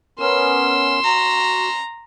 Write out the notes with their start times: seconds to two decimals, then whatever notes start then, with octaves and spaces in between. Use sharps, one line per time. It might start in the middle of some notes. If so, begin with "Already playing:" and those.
0.19 B3 C#4 A#4 C6 E6
1.04 F#4 A#5